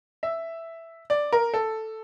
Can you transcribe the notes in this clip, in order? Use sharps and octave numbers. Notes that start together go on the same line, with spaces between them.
E5
D5
A#4
A4